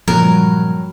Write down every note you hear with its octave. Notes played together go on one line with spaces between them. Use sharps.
G2 A#2 C#3 F3 F#3 A#3 A#4